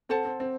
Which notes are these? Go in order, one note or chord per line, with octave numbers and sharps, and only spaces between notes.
C4 A4 C5 F#5 A5
C4
C4